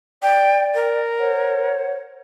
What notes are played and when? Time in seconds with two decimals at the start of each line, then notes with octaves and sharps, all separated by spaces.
0.23 D5 G5
0.75 A#4
1.19 C5 C#5 F#5